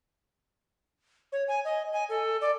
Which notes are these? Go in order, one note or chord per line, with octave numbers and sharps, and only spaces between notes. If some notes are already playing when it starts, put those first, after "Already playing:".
C#5
G#5
D#5
G#5
A4
D5